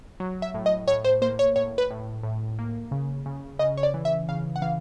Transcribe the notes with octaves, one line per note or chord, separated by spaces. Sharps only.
F#3
E5
A2
D#5
A2 C#5
C5
A#3 C5
C#5
A2 C#5
B4
A2
A2
A#3
C#3
C#3
C#3 D#5
C#5
D5
E3
E5
C#3 F5
F#5
E3 F5